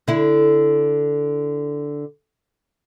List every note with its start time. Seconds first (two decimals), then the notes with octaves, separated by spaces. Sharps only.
0.08 D3 E4